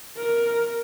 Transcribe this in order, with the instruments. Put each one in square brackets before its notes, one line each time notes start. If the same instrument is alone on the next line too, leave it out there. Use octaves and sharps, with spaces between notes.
[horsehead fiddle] A#4